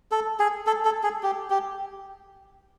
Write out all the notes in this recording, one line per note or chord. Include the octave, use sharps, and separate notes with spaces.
A4
G#4
A4
A4
G#4
G4
G4